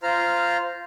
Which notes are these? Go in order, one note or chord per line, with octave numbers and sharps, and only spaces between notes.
F4 C5 A#5 F6